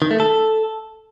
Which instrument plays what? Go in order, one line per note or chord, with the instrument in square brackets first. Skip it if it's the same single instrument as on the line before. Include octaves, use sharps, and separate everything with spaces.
[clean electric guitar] D#3
A3
A4